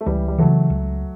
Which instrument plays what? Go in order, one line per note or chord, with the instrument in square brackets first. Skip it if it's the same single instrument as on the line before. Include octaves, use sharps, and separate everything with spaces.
[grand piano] A3
[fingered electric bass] C#2 [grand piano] E3 G3
[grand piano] G3
[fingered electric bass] C#3 E3 [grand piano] F#3 A3
[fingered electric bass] C#2